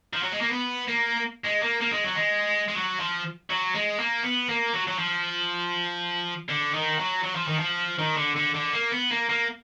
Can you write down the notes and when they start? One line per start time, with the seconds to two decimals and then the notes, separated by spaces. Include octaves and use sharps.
0.13 F3
0.23 F#3
0.32 G#3
0.41 A#3
0.50 B3
0.88 A#3
1.44 G#3
1.62 A#3
1.81 A#3
1.92 G#3
2.04 F#3
2.15 G#3
2.68 G#3
2.75 F#3
3.00 F3
3.50 F#3
3.75 G#3
3.99 A#3
4.24 B3
4.49 A#3
4.74 F#3
4.87 F#3
4.99 F3
6.49 D3
6.73 D#3
6.99 F#3
7.23 F#3
7.35 F3
7.47 D#3
7.59 F3
7.99 D#3
8.17 D3
8.36 D3
8.55 D3
8.73 A#3
8.92 B3
9.11 A#3
9.29 A#3